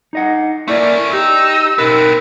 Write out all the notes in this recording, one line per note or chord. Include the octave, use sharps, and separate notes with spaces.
D#4 D#5 F#5
A3 A#3 C#4 E4 D5
D#4 G4 E6
B2 B3 C4 D#4 A#4